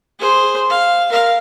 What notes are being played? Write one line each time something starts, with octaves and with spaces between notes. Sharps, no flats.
G#4 C5
F5
A#4 F5